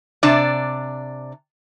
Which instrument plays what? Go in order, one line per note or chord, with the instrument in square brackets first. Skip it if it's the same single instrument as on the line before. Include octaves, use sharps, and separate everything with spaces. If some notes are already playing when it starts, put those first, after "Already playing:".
[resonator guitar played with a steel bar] C3 D4 D5